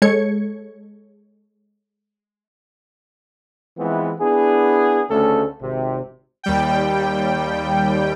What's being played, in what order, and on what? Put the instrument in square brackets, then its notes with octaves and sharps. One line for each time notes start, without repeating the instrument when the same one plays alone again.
[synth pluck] G#3 A4 C#5 G#6 C#7
[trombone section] E3 F3 G#3 B3 C4 E4
B3 D4 E4 G#4
D2 C#3 A3 C#4 G#4 A4
G#1 C3
[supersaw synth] D#2 G3 G5